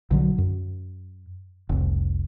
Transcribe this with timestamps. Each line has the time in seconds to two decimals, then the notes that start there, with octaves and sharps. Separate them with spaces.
0.11 B1 D3 F#3
0.38 F#2
1.69 F1 C2